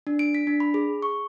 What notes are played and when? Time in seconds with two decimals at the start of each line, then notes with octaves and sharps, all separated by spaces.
0.07 D4
0.19 D7
0.35 B6
0.47 D4
0.60 B5
0.74 G#4
1.02 C#6